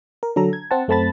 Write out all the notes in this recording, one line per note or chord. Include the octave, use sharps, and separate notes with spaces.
A#4
D3 F#3 A4 A#5
G#6
C4 F#5 A5
F#2 A3 C4 A5 B5 A6